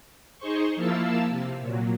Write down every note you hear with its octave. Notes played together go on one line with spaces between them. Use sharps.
D#4 G#4 C5 C6 C#6
F3 A#3 E4 F5 A5 E6
C3
A#2 F#3